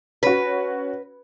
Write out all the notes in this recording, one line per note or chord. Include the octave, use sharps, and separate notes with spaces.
C#4 F#4 B4